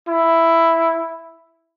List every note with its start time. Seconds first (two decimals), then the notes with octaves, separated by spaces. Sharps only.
0.08 E4